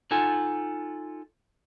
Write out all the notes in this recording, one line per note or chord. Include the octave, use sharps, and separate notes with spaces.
D#4 F4 A4 F#5 G#5